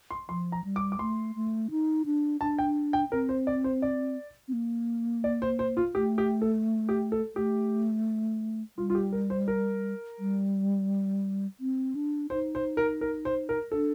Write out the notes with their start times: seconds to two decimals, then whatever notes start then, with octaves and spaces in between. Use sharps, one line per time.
0.11 C6
0.29 F3 C6
0.52 A#5
0.64 G3
0.76 D6
0.92 D6
0.99 A3 C6
1.35 A3
1.71 D#4
2.06 D4
2.41 D4 A5
2.59 G5
2.93 G5
3.12 C4 A#4
3.29 C5
3.47 D5
3.64 C5
3.82 D5
4.48 C4
4.53 A#3
5.24 D5
5.42 C5
5.59 C5
5.77 F4
5.95 A3 G4
6.18 G4
6.42 A4
6.89 G4
7.12 A4
7.35 A3 G4
8.77 G3 F4
8.90 F4
8.95 G4
9.12 A#4
9.30 C5
9.48 A#4
10.19 G3
11.60 C4
11.95 D4
12.30 D#4 C5
12.55 C5
12.77 A#4
13.01 A#4
13.25 C5
13.49 A#4
13.72 D4 A4